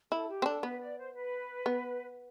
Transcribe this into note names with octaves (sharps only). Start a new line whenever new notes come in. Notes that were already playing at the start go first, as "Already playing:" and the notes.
E4 A4
G4
C4
D4 A4
B3 B4
D5
C5
B4
B3